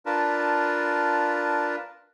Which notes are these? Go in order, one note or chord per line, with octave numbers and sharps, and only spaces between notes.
D4 F4 A#4 B4 A5